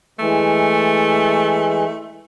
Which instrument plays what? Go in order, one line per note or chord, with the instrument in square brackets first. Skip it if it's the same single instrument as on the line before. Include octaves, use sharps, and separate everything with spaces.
[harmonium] E3 G#3 [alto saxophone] A3